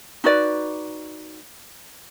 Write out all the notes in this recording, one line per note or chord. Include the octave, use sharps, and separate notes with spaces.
D#4 F#4 B4 D5